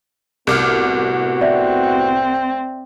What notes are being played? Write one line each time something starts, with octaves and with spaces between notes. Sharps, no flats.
C2 A2 B3 F#4 D6 F6
C4 D5 E5